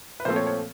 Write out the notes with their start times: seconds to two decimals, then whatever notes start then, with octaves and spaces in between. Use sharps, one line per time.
0.20 B4
0.25 A#2 F3 A3 C4 C5
0.36 C#5
0.47 C#5